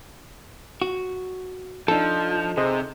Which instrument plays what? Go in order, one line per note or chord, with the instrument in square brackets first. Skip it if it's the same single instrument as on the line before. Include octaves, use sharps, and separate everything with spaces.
[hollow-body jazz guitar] F#4
[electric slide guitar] F3 [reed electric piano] D4 A5 [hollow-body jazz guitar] D#4 A4
[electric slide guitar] C3 [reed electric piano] G#4 C5 D#5